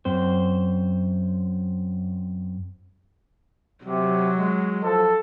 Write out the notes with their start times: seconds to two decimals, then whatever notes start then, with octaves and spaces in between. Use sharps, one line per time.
0.05 F#2 C4 C5
3.84 C3 F#3
4.37 G#3
4.83 F3 A4